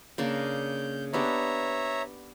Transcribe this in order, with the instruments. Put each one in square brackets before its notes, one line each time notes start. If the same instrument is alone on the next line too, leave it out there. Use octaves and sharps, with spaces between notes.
[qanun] C#3 A#3 D4 [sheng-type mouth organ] G6
[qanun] B3 D4 G4 [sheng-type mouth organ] C#5 E5 A#5